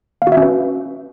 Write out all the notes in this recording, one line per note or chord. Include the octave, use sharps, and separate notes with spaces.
F5
F#4
E5
C#4
B4